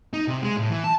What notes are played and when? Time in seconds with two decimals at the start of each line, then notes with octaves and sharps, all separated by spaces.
0.13 D#4
0.28 C3
0.42 G#3
0.57 A2
0.70 E3
0.84 A5